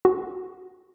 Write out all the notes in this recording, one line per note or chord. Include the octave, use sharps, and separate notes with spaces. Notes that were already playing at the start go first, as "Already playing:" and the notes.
F#4